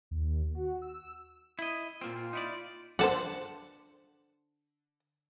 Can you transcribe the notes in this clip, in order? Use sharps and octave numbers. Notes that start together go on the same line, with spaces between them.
D#2
F#4
E6
E4 D#5
A#2 A#3 C4 F4
D#4 E4 D5
D3 C5 F#5 A5